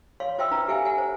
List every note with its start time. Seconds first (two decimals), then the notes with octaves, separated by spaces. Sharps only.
0.20 C#5 F5 C6
0.38 F4 C5 E5 G5 C6 E6
0.51 D4 F4 B4 A#5
0.68 G4 A4 E5 F5 G#5
0.85 F#5 G#5
0.98 C5